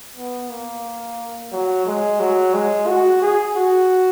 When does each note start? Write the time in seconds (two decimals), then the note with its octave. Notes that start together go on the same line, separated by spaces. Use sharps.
0.16 B3
0.50 A#3
1.52 F#3
1.86 G#3
2.20 F#3
2.54 G#3
2.87 F#4
3.22 G#4
3.55 F#4